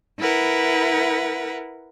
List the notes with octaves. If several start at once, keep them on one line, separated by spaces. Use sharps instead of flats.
E4 A#4 B4 F#5